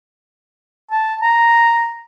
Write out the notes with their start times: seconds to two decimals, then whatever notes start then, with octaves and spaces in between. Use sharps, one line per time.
0.91 A5
1.22 A#5